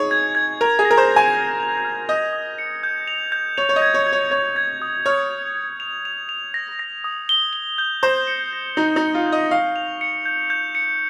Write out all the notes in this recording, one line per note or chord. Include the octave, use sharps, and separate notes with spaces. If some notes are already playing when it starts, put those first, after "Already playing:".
Already playing: D#4 G#4 C#5
G#6
G#6
A#4 F7
G#4
A#6
A#4
C5
G6
G#5
F6
F7
F6
D#5 G6
D#6
C#7
G6
F7
G6
C#5 F7
C#5
D#5
G#6
C#5
G#6
C#5
C#5 G#6
G#6
D#6
C#5 F6
F7
F6
F7
F7
F7
A#6
A#6
D#6
G7
G7
G6
C5 A#6
C#7
A#6
D#4 G6
D#4
C#7
F4
G6
D#5
F5 C#6
F7
C#7
G6
G6
C#7